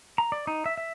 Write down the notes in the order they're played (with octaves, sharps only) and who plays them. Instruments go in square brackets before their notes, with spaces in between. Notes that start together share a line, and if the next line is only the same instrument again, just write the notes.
[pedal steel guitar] A#5
D5
D#4
E5
E5